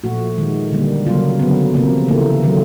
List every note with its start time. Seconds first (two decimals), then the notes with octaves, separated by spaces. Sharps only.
0.04 A#2 F3 A3 F#4
0.38 D#3 G#3
0.72 D3 G3 A#3
1.06 C#3 F#3 A#3 F4
1.39 D3 F#3 A3 B3
1.74 C3 F3 A#3
2.08 C#3 E3 A3 A#3
2.43 D#3 F#3 A3